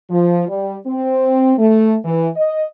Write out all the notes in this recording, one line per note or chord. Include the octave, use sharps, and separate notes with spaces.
F3
G3
C4
A3
E3
D#5